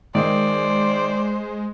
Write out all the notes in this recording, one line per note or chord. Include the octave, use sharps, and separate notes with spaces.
D#3 G#3 C5 D5